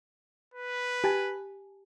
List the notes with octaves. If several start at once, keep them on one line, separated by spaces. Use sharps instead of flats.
B4
G4 G#5 A5